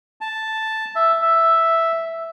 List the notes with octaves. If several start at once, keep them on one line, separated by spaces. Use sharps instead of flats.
A5
E5
E5